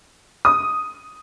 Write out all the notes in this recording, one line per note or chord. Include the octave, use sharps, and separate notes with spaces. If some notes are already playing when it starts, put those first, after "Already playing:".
D#6